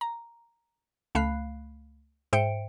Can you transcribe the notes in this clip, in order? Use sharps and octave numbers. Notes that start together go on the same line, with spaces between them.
A#5
C#2 A3 F5 B5 F#6 C7
G#2 C5 E5 G5 C#7 D7